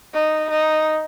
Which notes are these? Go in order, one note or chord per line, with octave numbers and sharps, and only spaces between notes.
D#4
D#4